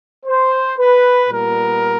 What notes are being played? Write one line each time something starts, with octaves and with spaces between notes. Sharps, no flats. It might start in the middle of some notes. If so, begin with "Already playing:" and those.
C5
B4
A#2 G3 B3 A#4